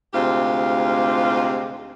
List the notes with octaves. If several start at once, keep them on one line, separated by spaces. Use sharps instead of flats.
D2 G#2 C3 F4 G4